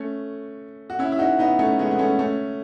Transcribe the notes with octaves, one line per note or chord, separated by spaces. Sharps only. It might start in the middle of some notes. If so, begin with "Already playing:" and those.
Already playing: A3 C#4
F#4
C#4 E4
E4
D#4 F#4
B3 D#4
A3 C#4
G#3 B3
B3
A3 C#4
A3 C#4